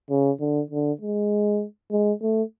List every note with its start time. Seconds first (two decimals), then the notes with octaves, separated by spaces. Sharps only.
0.10 C#3
0.40 D3
0.71 D3
1.01 G#3
1.91 G#3
2.22 A3